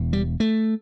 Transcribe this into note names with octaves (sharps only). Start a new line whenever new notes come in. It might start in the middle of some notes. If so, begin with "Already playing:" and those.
Already playing: E1 E2
G3
A3